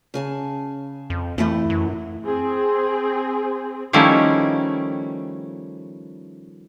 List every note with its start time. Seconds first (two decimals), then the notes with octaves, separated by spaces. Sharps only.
0.14 C#3 G#4 A5
1.10 F2
1.38 F2 E3 A3 E4
1.70 F#2
2.26 C4 G#4
3.93 D#3 F3 G3 A3 C#4 E4